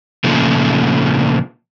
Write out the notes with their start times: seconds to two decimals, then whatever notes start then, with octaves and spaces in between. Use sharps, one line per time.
0.24 A#2 C#3 F3 A3